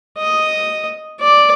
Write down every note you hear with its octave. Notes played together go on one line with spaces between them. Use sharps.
D#5
D5